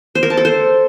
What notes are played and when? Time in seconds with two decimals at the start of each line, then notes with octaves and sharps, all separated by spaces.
0.15 C5
0.23 A#4
0.30 A5
0.37 A4
0.45 C5